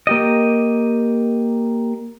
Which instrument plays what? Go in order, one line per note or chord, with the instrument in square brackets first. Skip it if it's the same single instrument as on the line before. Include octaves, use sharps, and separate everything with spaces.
[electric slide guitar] A#3 G4 D#5